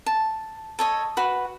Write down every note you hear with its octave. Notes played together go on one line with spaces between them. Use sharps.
A5
A4 C#5 D#5
F#4 B4